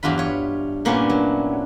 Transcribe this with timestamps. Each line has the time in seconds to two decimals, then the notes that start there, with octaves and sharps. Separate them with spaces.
0.03 E2 G2 F#3 F4 B5
0.18 F4 C#5
0.85 A#2 A#3 B3 C#4 D4 E4
1.10 F#3